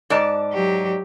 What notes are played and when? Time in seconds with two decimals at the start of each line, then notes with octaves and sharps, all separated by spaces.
0.10 G#2 D5 A5
0.53 F#3 G4